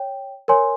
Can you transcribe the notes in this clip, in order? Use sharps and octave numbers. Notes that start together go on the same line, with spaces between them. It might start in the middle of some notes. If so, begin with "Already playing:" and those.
Already playing: C#5 G5
A#4 C#5 G#5 C6